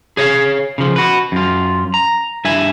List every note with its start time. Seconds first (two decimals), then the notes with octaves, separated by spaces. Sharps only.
0.17 G#4 C#5 D#5 F5 G#5
0.78 C#3 F3
0.96 F#4 B4
1.32 F#2 F4
1.94 A#5
2.45 G2 E5 G#5